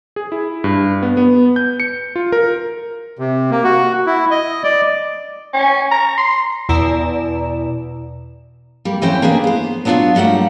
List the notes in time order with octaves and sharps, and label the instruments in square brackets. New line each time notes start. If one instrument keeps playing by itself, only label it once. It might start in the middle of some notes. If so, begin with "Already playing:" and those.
[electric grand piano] G#4
E4
G2
B3
B3
G6
C#7
F4
A#4
[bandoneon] C3
A#3
F#4
E4
D#5
D5
[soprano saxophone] C#4
A#5
C6
[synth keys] E2 B2 E4 D5 A#5 E7
[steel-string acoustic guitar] G3 A#3
F2 E3 C#4 C5 G5
A#3 D4 G#4 B4
B3 C5
F#3 B3 D4 D#4 F4 F#4
F#3 G3 A3 A#3 F#5